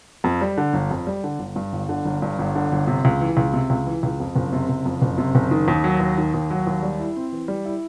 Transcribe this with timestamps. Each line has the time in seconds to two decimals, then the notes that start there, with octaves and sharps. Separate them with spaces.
0.24 F2
0.41 G3
0.57 D3
0.73 G1
0.91 F2
1.07 G3
1.24 D3
1.39 G1
1.56 G2
1.73 G1
1.89 D3
2.05 G1
2.22 G2
2.39 G1
2.55 D3
2.72 G1
2.87 C3
3.05 C#2
3.21 E3
3.37 C#2
3.53 C3
3.70 C#2
3.87 E3
4.03 C#2
4.20 F2
4.36 F#1
4.53 C3
4.69 F#1
4.85 F2
5.02 F#1
5.18 C3
5.35 F#1
5.51 D#3
5.68 D#2
5.84 F#3
6.00 D#2
6.18 D#3
6.34 D#2
6.51 F#3
6.67 D#2
6.83 G3
6.99 E4
7.16 C4
7.32 E3
7.48 G3
7.65 E4